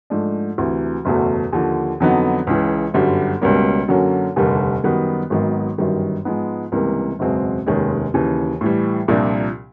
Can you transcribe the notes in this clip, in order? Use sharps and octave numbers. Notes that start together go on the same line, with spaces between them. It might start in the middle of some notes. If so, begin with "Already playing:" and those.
G#2 F3 A3 D4
D2 C3 E3
F#1 E2 B2 F#3 A3
D#2 D3 F3
F2 D3 F#3 B3 D#4
C#2 C#3 E3
G1 F#2 D3 G3
C#2 B2 G3 A#3 C#4
F#2 D3 F#3 A#3 C#4
F1 D#2 D3 G3 A#3
F#2 D#3 G3 B3
G#1 G#2 D#3 F#3 B3
G1 F#2 D#3 G3
G#2 F3 G#3 B3 D#4
C#2 C3 E3 G3 A#3
F#1 E2 B2 G#3 C4
F1 D#2 D#3 G#3 C#4
D#2 C#3 E3
A2 E3 G3
C2 A#2 F3 A#3 D4